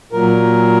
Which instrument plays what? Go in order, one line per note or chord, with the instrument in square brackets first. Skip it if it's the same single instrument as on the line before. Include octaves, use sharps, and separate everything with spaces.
[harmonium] A#2 F#3 A#4